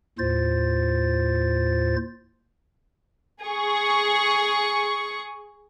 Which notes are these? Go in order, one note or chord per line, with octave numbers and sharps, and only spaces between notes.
D#2 A2 F4 C5 A6
G#4 C#6